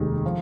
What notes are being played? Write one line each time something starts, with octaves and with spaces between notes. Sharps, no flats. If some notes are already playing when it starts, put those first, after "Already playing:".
Already playing: F1 D#2 D#3 G#3
F3